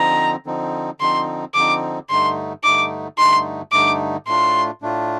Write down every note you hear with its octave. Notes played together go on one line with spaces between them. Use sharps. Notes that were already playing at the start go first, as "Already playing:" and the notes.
Already playing: D3 F3 C4 D#4 A#5
D3 F3 C4 D#4
D3 F3 C4 D#4 C6
D3 F3 C4 D#4 D6
G2 D3 A3 D#4 C6
G2 D3 A3 D#4 D6
G2 D3 A3 D#4 C6
G2 D3 A3 D#4 D6
A2 A3 D4 F4 C6
A2 A3 D4 F4